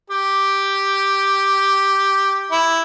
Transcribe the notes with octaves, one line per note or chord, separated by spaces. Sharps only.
G4
E4